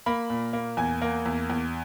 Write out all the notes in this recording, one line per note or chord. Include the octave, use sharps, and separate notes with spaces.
A#3 B5
A#2
A#3
E2 G#5
A#3
E2
E2